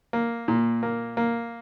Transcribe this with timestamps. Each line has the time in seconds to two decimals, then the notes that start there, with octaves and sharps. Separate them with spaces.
0.13 A#3
0.48 A#2
0.83 A#3
1.17 A#3